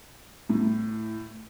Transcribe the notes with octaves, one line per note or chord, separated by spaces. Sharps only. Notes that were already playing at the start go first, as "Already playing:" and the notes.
A2